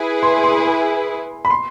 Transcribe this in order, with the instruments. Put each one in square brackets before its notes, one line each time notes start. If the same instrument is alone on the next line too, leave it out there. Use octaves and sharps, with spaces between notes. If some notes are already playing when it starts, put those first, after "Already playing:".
Already playing: [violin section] E4 G#4 B4
[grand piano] C6
C6
B5
C6